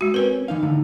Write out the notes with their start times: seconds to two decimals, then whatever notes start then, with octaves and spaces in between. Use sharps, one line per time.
0.01 G#3 F#4
0.14 C4 C#4 A#4 B4
0.48 E3 D#4 F5
0.62 A2 D3 D#4